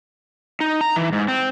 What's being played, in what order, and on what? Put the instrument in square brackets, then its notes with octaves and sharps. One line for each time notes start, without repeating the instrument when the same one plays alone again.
[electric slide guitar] D#4
A#5
E3
G#2
C4